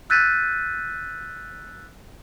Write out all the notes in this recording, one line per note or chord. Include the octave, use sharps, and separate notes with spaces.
E6 F#6 G6 A6 B6 D#7